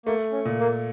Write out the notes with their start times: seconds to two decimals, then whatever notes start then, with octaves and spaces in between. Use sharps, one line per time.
0.06 A3 A#3
0.32 C#4
0.45 A#2
0.59 A#3